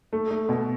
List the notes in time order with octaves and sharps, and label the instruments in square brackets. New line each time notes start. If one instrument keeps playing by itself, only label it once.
[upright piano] A3
A3
B2